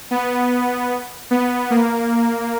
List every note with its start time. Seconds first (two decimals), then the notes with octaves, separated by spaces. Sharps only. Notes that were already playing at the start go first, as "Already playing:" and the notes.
0.11 B3
1.31 B3
1.70 A#3